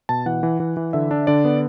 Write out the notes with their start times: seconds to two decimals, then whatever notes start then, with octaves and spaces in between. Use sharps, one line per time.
0.09 B2 A5
0.26 E3 F#5
0.43 E3
0.60 E3
0.77 E3
0.93 D3 E5
1.11 D4
1.27 D3 D5
1.45 B3